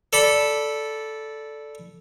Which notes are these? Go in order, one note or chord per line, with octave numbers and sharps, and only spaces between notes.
A4 D5 B5